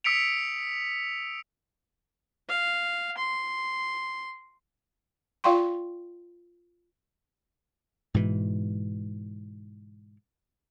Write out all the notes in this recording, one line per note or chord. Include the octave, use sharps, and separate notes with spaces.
D#6 E6 B6 C#7 D7 F7
F5
C6
F4 D5 F5 G5 C6 C#6
G#2 B2 E3